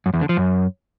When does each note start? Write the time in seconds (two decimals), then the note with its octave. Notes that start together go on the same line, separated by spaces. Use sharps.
0.06 F#2
0.14 E2
0.21 D3
0.29 F3
0.37 F#2